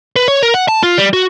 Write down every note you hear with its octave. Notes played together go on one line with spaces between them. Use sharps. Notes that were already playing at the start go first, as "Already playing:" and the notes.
B4
C#5
A#4
F#5
A5
F4
G3
F#4